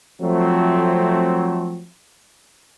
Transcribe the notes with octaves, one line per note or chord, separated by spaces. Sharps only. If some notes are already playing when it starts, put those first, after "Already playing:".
F3 F#3 A3 C4